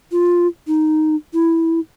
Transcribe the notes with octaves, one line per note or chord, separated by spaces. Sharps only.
F4
D#4
E4